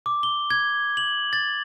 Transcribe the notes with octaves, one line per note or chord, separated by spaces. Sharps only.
D6
G7
G#6
F#7
A6